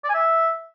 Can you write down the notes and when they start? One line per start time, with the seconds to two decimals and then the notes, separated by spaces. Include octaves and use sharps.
0.04 D5
0.09 G#5
0.14 E5